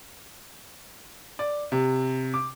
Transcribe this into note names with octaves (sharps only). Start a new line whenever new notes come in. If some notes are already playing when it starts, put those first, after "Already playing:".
D5
C3
D6